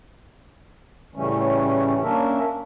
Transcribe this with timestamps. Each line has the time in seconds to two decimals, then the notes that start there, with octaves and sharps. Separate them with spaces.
1.16 A2 C#3 E3 G3 A3 C#4
2.02 A#3 C#4 D4 A#4 E5